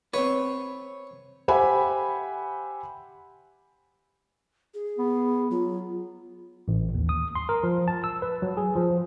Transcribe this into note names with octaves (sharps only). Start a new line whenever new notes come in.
C4 B4 C#5
G4 C5 E5 F#5 G#5 B5
G#4
B3
F#3 F4
A1
D#2
D#6
C6
A#4
F3
A5
E6
B4
F#3
G#4
F3